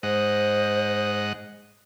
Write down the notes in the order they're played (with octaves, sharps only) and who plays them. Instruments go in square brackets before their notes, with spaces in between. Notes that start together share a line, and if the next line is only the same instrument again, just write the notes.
[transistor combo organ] G#2 D#5 F#5 [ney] C5